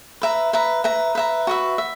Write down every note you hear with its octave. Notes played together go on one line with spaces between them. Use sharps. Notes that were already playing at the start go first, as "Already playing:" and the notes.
B4 E5 A#5
B4 E5 A#5
B4 E5 A#5
B4 E5 A#5
F#4 B4 E5
E5